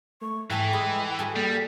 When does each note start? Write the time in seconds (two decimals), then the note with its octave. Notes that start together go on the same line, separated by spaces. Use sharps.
0.21 A3 C#6
0.50 G#2 E3 E4 G#4 A4 G5
0.73 G#3 B5
1.19 F#4 G#4 A4
1.36 G3 A#3